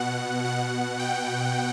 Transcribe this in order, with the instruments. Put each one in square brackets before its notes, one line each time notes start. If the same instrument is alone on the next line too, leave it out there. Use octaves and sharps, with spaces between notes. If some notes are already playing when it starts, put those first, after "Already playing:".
Already playing: [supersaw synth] B2 F#5
B2 F#5
G5